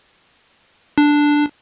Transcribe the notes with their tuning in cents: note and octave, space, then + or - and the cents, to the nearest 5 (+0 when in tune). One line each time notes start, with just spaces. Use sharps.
D4 +0